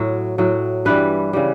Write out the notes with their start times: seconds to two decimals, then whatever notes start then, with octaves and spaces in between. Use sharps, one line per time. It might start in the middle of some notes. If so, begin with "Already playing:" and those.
Already playing: A2 F#3
0.38 A2 F#3
0.85 G2 E3 G3 B4
1.33 C#3 E3 G3